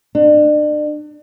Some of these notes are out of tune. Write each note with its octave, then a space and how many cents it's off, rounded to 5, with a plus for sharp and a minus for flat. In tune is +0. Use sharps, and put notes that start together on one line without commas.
D4 +40